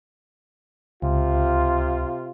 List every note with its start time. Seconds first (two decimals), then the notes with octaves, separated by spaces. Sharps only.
1.02 C#2 C3 F4